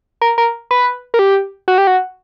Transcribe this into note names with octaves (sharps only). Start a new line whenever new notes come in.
A#4
A#4
B4
A#4
G4
F#4
G4
F#4